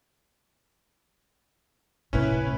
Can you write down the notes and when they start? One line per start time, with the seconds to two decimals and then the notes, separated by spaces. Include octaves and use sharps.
2.13 A2 C3 C#4 E4 B4